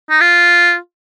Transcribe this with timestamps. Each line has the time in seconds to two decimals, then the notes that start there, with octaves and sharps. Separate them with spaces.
0.10 D#4
0.21 F4